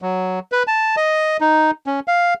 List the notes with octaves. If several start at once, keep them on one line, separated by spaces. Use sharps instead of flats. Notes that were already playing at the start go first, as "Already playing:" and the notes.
F#3
B4
A5
D#5
D#4
C#4
F5